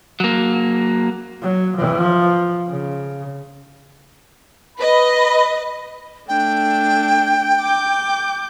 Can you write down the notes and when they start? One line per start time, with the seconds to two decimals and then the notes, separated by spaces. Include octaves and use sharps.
0.20 F#3 A#3
1.43 F#3
1.78 F3
2.68 C#3
4.77 B4 D#5 B5
6.28 A3 D4 G5
7.61 D6 G6